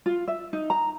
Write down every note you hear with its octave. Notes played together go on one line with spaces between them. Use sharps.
F4
E5
D#4
A#5